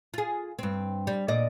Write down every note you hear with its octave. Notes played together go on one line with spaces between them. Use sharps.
F4 G#4
G2 C4
G3
A#2 D5 D#5